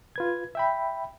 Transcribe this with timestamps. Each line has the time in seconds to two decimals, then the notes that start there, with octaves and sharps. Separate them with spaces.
0.16 F4 B4 G#6
0.55 E5 G5 B5